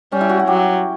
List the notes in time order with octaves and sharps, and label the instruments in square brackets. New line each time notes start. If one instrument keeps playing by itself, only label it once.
[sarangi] G3 [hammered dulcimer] C#4
[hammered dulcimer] E4
F#4
F#4
[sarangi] F#3 [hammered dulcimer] G4